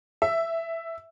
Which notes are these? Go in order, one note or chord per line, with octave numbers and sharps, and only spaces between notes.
E5